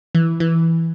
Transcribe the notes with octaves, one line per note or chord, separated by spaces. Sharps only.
E3
E3